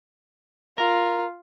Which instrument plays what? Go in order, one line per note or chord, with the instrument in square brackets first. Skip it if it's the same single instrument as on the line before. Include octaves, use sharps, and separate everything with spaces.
[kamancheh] F4 [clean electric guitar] A#4